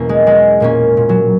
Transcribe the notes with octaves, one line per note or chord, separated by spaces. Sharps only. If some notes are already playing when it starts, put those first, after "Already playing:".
Already playing: E2 B2 A#3 C#4 E4
G#3
B2 G#3
A#2 A#3 C#4
A#2
F#3